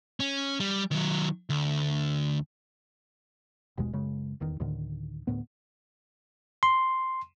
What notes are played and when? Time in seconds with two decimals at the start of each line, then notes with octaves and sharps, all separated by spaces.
0.20 C#4
0.60 G3
0.92 D#3 F#3
1.50 D2
3.78 F#1 D#2 B2 G#3
3.93 F#2 C#3 G#3
4.40 D#1 E2 D#3
4.60 D2 A2 D3 D#3
5.27 D2 A2 B3
6.63 C6